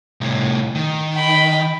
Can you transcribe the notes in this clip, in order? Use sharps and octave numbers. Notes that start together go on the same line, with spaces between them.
C2 A2
D#3
G5 B5